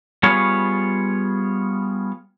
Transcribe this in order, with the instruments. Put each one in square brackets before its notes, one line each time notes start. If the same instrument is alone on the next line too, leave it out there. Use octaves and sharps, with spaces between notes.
[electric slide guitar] G3 B3 F4 G#4 C#5